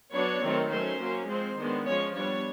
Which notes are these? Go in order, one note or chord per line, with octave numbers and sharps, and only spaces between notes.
F#3 B3 D4 C#5
D#3 F#3 A3 C4
F#3 A3 C#4 C5
F#3 A#3 C#4
F3 G#3 C4 C5
D#3 G#3 B3 D4
F3 G#3 C#4 C#5
G3 B3 D4 C#5